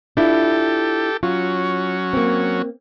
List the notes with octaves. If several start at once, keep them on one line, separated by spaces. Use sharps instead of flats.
D4 E4 F4 G4 A4
F#3 C#4 F4
A#3 C4